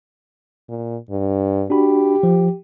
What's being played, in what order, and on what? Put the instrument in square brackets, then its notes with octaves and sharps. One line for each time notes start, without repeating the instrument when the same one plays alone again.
[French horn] A#2
G2
[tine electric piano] D4 F#4 B5 [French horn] G4
[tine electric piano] F3